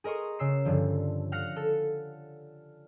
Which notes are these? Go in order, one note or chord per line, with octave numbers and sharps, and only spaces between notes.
G#4 A#4 D#5 C6 C#6
C#3 E6 C7
G2 D3 F3
F5 F#5 F6 A#6 C#7
A4